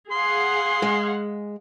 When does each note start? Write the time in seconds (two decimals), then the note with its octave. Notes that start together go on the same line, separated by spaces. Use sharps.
0.11 G#4 F5 F#5 C6
0.82 G#3